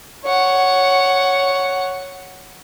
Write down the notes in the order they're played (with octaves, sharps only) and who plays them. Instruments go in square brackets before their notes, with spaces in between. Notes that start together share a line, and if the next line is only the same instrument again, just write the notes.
[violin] C#5 F#5